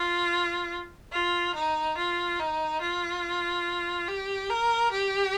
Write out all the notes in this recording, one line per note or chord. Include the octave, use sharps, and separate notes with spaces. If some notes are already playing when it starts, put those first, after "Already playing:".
Already playing: F4
F4
D#4
F4
D#4
F4
G4
A#4
G4